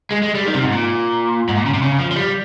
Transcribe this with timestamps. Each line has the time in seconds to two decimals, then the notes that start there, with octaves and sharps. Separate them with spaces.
0.12 G#3
0.23 G#3
0.35 G3
0.47 D#3
0.55 C3
0.63 G#2
0.71 A#2
1.49 G#2
1.57 A#2
1.66 C#3
1.74 C3
1.82 C#3
1.98 F3
2.11 F3
2.16 G3